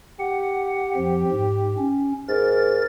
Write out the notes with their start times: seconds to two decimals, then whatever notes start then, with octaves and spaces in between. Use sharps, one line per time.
0.20 G4 F#5
0.96 F2 F3
1.31 G#2
1.78 C#4
2.28 G#2 A#4 A6